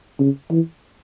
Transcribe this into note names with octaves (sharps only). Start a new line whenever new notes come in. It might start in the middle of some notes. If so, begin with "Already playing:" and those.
C#3
E3